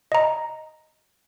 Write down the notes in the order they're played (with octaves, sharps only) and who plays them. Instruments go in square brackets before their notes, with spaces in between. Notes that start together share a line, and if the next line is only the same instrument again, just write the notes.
[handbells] D#5 A#5